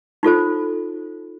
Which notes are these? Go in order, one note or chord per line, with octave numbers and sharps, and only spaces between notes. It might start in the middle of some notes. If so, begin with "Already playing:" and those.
D#4 F4 A4 C5